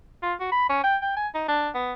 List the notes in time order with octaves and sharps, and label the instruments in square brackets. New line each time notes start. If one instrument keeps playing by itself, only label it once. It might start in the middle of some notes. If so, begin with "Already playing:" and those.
[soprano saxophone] F4
F#4
B5
C#4
G5
G5
G#5
D#4
D4
B3